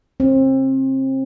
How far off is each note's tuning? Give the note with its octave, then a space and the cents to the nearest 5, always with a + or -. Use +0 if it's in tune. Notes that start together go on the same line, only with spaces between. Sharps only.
C4 +30